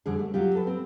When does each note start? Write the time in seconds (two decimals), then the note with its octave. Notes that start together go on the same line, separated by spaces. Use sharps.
0.06 F2 D3 G3 G#4
0.19 A3
0.34 F#3 F4 G4
0.55 A4 B4
0.67 C4